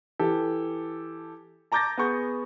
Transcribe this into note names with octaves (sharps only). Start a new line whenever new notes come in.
E3 G4 A4
A5 A#5 D6 G6 A6 A#6
B3 G#4 C#6 G6